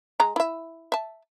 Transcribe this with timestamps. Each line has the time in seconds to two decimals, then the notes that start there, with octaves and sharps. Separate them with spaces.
0.20 G#3 A#5
0.36 E4 E5
0.92 E5 A5